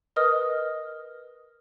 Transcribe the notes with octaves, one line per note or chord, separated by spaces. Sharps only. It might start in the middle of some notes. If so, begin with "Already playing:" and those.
A#4 B4 D#5 D#6 F6